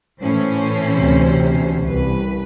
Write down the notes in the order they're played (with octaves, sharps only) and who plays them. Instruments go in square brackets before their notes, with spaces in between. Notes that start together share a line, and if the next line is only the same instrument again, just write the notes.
[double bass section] A2 [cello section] E3 C#4 C5
[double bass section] D2 C3
[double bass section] C2 [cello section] B4